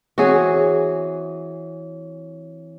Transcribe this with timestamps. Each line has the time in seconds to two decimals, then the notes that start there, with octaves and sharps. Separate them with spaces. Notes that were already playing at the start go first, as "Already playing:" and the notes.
0.18 E3 C4 F#4 G#4 C#5